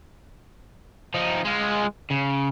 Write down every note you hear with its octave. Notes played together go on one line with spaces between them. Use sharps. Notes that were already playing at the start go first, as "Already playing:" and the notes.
F3 D#4
G#3 F4
C#3